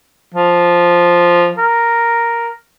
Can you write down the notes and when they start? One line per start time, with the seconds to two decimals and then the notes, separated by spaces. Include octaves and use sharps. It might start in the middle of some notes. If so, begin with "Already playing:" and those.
0.34 F3
1.58 A#4